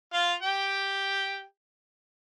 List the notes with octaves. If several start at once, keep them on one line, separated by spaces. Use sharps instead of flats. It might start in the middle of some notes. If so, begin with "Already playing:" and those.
F4 F5
G4 G5